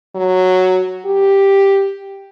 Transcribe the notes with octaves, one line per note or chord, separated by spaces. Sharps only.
F#3
G4